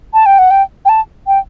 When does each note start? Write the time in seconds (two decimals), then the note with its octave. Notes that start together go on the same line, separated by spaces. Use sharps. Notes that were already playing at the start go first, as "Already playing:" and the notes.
0.14 A5
0.26 G5
0.39 F#5
0.51 G5
0.85 G5
0.89 A5
1.27 G5